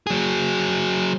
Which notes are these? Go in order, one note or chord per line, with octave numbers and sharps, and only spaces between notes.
F#3 G#4